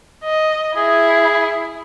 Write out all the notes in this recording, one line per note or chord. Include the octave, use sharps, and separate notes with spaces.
D#5
E4 G#4